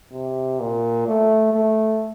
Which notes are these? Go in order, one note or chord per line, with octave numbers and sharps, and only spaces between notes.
C3
A#2
A3
A3